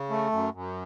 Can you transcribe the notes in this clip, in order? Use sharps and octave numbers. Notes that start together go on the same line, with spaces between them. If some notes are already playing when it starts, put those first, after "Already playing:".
Already playing: C#3
A3
F#2
F#2